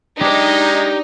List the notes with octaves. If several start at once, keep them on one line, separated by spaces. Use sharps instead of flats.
G#3 D4 D#4 G4